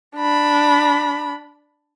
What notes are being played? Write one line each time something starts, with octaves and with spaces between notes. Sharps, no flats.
D4 B5